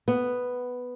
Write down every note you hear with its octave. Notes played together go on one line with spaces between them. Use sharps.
B3